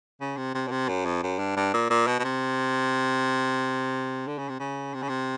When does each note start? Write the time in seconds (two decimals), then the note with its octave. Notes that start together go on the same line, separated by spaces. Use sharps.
0.21 C#3
0.37 C3
0.54 C3
0.67 B2
0.71 C3
0.88 F#2
1.05 F2
1.22 F#2
1.39 G2
1.56 G2
1.73 A#2
1.90 A#2
2.07 B2
2.19 B2
2.24 C3
4.27 D3
4.38 C#3
4.49 C3
4.60 C#3
4.94 C3
5.02 C#3
5.09 C3